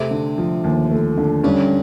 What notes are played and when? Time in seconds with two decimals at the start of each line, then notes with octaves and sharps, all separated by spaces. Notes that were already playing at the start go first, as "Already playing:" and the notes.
Already playing: C3 A3
0.11 D3
0.38 F3
0.64 D#2
0.91 A3
1.17 D3
1.44 G2 C#4